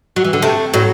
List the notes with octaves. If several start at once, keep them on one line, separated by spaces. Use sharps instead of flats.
F#3
E3
D3
C3 A3
A2 F#3